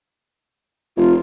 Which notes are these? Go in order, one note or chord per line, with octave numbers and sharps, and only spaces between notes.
F1 F4